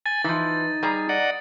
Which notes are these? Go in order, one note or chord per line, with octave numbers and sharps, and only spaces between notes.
G#5 A6
E3 F3 D#4
G3 G#4 A#5
D5 D#5 F#5